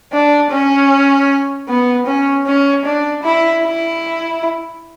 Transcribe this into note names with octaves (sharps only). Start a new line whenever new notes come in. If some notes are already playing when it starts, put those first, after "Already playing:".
D4
C#4
B3
C#4
C#4
D4
E4
E4